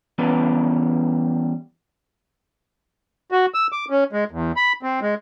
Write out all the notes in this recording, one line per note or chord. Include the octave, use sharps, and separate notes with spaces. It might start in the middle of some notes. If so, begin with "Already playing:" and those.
E3 G3 B3 C#4 B4 D5
F#4
E6
D6
C#4
G#3
E2
B5
C4
G#3